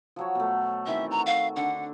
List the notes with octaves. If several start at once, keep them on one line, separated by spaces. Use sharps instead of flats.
F3 F#3 C#5
B2 A3
D#3 E3 C4 E5
F#4 A#5
F5
D3 F#5